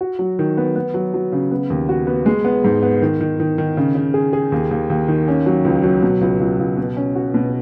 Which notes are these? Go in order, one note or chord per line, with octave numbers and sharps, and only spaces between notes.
F#4
F#3
D#3
B3
B3
F#3
F#3
C#3
B3
D#2
F#4
B3
G#3
B3
G#2
B3
D#3
D#3
D#3
D#3
C#3
C#3
G#4
G#4
D#2
D#2
D#2
D#3
C#4
F#3
C#2
F#3
B2
C#2
C#2
C#2
B2
C#4
F#4
B2